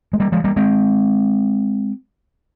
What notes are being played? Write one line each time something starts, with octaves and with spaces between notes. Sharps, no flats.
G#3
G3 A#3
F3 G#3
G3 A#3
G#3 C4